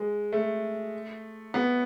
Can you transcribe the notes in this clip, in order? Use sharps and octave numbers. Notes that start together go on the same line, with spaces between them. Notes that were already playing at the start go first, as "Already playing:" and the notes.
Already playing: G#3
A3
B3